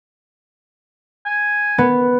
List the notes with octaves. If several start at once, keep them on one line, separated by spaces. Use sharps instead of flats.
G#5
B3